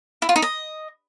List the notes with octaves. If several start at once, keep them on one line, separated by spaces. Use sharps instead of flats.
E4
F4
D#4
D#5